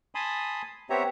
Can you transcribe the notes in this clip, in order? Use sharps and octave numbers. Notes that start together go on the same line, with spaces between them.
G#5 A5 B5 C6 D#6
B3 C4 G4 C#5 E5 A#5